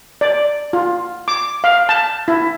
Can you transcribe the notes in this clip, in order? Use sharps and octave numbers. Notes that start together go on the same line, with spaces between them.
D5
F4
D6
F5
A5
E4